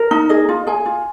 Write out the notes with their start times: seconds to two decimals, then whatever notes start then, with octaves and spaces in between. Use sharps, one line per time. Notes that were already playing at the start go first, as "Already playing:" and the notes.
Already playing: A#4
0.11 D#4
0.29 G#4 D#5
0.49 F4
0.67 G#4 G#5
0.86 F4